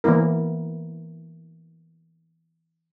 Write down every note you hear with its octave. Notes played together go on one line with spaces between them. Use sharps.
E3 A#3 B3 E4 A#4